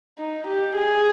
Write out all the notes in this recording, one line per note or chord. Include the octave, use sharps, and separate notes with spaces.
D#4
G4
G#4